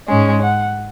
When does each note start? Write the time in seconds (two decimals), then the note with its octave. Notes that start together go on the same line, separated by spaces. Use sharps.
0.08 G#2 G#3 C#4
0.41 F#5